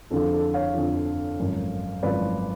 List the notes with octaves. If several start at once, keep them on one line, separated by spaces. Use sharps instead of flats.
F2 D3 F3 A4
A4
C#5 F5
F2 D3 F3
G#1 F#2 F3
G#1 F#2 F3 B4 D5